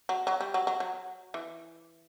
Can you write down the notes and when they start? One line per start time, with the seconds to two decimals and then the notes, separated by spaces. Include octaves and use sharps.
0.09 F#3
0.27 F#3
0.41 G3
0.54 F#3
0.67 F#3
0.80 F#3
1.34 E3